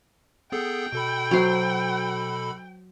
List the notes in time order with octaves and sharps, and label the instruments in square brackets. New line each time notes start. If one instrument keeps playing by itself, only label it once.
[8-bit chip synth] B3 G#4 A4 [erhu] G5
[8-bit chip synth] B2 A4 B5
[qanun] F#3 C5